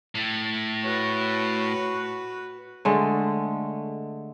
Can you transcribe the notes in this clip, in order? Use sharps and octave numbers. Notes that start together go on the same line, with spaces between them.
A2
F#4 B4 C#5
D3 G#3 A3